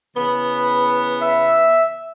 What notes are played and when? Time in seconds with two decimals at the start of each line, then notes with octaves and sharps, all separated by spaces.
0.17 C#3 E3 B3
1.22 E5